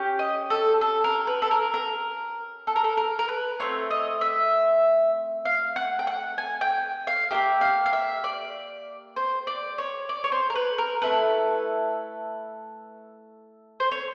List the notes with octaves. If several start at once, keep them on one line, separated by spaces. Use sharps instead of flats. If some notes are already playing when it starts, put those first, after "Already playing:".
Already playing: C#4 G4
D#5
A4
A4
A#4
B4
A4
A#4
A#4
A4
A#4
A4
A#4
A#4
B4
A3 C4 F4 C#5
D#5
E5
F5
F#5
G5
F#5
G#5
G5
F5
A#3 D#4 G4 E5
F5
F5
E5
D5
C5
D5
C#5
D5
C#5
C5
A#4
B4
A#4
A3 C#4 E4 A4 B4
C5
C#5